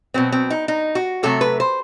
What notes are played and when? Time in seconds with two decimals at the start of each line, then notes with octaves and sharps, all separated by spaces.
0.14 B2 F#3 B3 C4
0.32 C4
0.50 D#4
0.68 D#4
0.95 F#4
1.23 C3 F#3 A3 A4
1.41 B4
1.60 C5